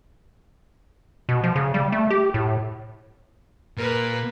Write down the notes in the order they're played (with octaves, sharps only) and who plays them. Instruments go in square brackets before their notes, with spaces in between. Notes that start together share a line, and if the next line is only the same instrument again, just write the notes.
[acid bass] B2
F3
C#3
G3
A3
G4
A2
[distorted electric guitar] A#2 [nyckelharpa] A#4 B4